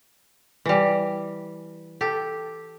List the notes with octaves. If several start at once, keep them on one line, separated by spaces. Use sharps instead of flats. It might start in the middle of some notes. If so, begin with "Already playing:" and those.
E3 G3
G4 A4